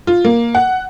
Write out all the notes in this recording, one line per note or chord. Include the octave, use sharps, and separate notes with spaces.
F4
A#3
F#5